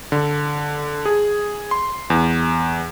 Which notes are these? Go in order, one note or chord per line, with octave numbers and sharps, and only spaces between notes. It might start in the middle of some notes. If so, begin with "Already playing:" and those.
D3
G#4
C6
E2